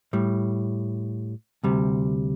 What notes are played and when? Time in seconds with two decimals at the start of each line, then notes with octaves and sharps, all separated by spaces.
0.13 A2 G3
1.63 D2 C3 G3